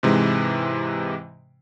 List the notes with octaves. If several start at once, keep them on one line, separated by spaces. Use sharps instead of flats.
G#2 C3 E3 G#3